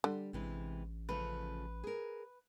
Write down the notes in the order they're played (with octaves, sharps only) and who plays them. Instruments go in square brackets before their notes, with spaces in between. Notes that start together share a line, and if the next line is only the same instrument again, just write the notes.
[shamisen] D3 [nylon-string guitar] G3
[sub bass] A1 [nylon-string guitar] C3 E3 G#3
[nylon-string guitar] C#3 F3 A3 [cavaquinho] B4
[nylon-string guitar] G#4 A#4